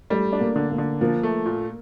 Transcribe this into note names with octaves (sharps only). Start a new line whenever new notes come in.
G3 A3 A4
D4
A#3 A#4
D3
A#3 A#4
D3
F3 A#3 A#4
A3
A#2